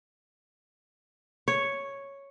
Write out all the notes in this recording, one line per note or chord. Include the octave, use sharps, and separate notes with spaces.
C#5